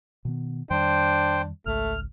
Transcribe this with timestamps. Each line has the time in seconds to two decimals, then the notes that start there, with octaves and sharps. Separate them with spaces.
0.25 B2 D#3 B3
0.70 F2 D#3 G3 D4 C5 G5
1.66 G#1 C#2 A3 F6